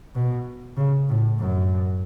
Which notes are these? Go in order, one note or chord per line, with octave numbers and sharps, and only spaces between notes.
B2
C#3
A2
F#2